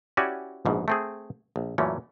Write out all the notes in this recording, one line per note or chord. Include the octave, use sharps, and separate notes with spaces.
C#4 E4 F#4 G4 D5 G#5
A#1 G#2 B2
A3 C4 G#4
A#1
F#2 A#2 E3 A3 C#4